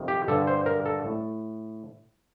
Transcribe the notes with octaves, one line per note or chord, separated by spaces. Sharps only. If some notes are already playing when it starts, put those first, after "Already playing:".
Already playing: F2 C3 D#3
G4
G2 D3 A4
C5
A#4
A4
A2